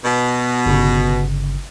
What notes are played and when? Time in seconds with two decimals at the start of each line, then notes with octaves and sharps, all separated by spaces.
0.04 B2
0.66 G1 C#3